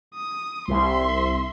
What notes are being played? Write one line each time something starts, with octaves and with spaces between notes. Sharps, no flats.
D#6
C2 E5 C6